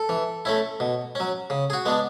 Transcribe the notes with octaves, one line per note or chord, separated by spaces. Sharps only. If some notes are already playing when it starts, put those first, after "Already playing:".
Already playing: A4
E3
A3 C#4 E4
B2
F#3 C#4
C#3
G#4
F#4
G#3 B3 D4